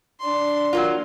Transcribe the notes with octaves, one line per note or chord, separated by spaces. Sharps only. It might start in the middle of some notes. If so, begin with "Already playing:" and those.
D4 C6
F#3 A#3 F4